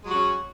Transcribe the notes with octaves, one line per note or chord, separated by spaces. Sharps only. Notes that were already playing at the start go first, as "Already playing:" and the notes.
F#3 G#3 C#4 F#4